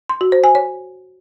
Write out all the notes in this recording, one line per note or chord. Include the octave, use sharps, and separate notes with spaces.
C6
F#4
C5
G#5
C#5